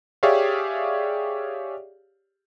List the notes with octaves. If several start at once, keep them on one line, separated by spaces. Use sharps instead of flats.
G4 G#4 C#5 D5 E5 F5